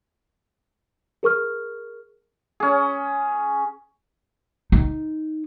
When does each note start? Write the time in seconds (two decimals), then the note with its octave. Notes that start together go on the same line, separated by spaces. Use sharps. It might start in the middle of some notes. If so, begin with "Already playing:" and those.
1.23 G#4 A#4 C#6 F6
2.60 C#4 G#4
4.72 D#4